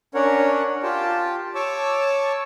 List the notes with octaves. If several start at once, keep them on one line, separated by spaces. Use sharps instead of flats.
C#4 D4 A#4 C#5 F#5
F4 G4 G5 A5
C#5 A5 C#6 D6 E6